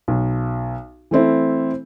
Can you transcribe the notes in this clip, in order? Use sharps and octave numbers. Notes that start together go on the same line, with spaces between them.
B1
E3 A3 C4 E4